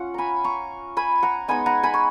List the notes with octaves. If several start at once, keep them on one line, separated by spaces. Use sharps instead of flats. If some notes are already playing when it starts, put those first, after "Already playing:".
Already playing: C#4 F4 F#5
G#5 A#5 B5
A#5 C#6
G#5 B5
F#5 A#5
G#3 B3 D#4 G#5 B5
F#5 A#5
G#5 B5
C#6